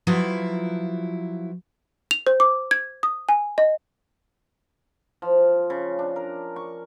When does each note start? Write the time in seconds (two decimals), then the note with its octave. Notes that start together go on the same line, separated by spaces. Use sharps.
0.07 F3 F#3 E4 F4 B4
2.11 F7
2.27 C5
2.40 D6
2.71 G#6
3.03 D#6
3.29 G#5
3.58 D#5
5.22 F3
5.70 C#3
5.99 D4
6.16 A#4
6.56 C#6